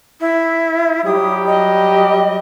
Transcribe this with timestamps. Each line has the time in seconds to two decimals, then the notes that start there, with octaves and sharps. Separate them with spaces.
0.21 E4
1.05 F#3 G3 G4 D#6
1.47 D#5